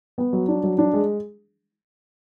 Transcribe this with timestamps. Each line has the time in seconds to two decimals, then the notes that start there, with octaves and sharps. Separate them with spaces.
0.18 B3
0.33 F#3
0.48 D4
0.63 F#3
0.78 D4
0.93 G#3